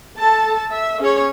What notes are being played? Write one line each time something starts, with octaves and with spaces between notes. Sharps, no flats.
A4 A5
E5
C#4 G#4 C#5